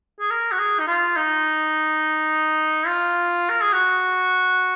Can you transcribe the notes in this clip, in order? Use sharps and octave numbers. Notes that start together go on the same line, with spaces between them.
G#4
A#4
F#4
G#4
D#4
F4
D#4
F4
A#4
G#4
F#4